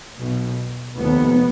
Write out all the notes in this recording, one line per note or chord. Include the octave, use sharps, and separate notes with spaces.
B1 B2
F1 D#2 B3